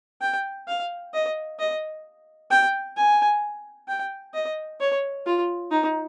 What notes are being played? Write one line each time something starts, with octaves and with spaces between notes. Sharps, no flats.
G5
F5
D#5
D#5
G5
G#5
G5
D#5
C#5
F4
D#4